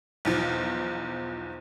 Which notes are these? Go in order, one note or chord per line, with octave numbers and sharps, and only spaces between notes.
B1 E2 F3